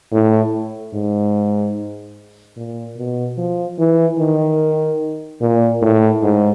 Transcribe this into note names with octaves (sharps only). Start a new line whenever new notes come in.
A2
G#2
A#2
B2
F3
E3
D#3
A#2
A2
G#2